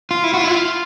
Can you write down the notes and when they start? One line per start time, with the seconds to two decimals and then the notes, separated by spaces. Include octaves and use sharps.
0.11 F4
0.24 E4
0.34 F#4
0.37 F4
0.44 E4
0.51 F4